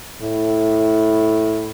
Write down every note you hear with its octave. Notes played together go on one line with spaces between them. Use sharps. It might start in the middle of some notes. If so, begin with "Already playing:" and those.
A2